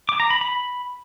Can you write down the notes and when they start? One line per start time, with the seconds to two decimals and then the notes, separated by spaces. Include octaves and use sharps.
0.09 D6
0.20 A#5
0.30 B5
0.41 B5